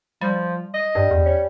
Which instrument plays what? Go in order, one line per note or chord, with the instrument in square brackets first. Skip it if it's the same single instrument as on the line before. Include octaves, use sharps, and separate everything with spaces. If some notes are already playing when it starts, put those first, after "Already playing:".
[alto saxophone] F3 [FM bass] G3
[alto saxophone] D#5
[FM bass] G2 [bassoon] G3
[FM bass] E2
[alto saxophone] C#4